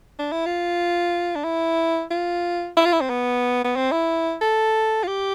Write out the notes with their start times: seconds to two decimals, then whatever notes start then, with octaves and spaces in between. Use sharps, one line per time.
0.19 D4
0.32 E4
0.46 F4
1.36 D4
1.44 E4
2.11 F4
2.77 E4
2.85 F4
2.93 E4
3.01 C4
3.09 B3
3.64 B3
3.76 C4
3.92 E4
4.41 A4
5.03 F4
5.07 G4